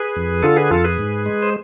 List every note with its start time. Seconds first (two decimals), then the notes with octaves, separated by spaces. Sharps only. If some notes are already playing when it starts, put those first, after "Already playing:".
Already playing: G#4 B4
0.16 F2
0.43 D3 F4 A4
0.56 G#4 B4
0.70 F2 F4 A4
0.84 G#4 B4
0.99 G#2
1.26 G#3
1.43 C5